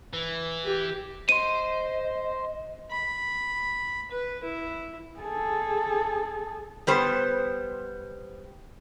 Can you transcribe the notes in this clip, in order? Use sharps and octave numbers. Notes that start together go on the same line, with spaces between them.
E3
G4
C5 D#5 C6 D#7
B5
B4
E4
G#4 A4
G3 B3 C5